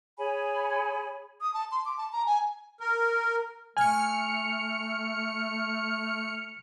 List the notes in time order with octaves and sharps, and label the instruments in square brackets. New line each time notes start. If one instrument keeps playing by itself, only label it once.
[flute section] G#4 C#5 G#5 B5
[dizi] D#6
A5
C6
D6
A5
A#5
G#5
[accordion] A#4
[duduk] A3 [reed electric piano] G#5 [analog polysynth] F6 C#7